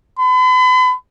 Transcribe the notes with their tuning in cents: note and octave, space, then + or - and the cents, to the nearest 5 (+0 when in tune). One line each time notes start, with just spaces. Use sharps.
B5 +40